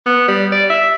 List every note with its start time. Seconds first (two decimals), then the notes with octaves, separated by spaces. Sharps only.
0.06 B3
0.28 G3
0.52 D5
0.70 E5